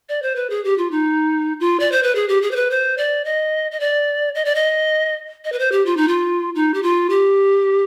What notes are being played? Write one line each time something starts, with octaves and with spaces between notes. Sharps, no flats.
D5
C5
B4
G#4
G4
F4
D#4
F4
D5
C5
B4
G#4
G4
G#4
C5
B4
C5
D5
D#5
D#5
D5
D#5
D5
D#5
D#5
B4
C5
G4
F4
D#4
F4
D#4
G4
F4
G4